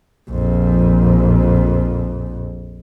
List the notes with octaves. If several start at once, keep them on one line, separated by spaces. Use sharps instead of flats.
A#1 F2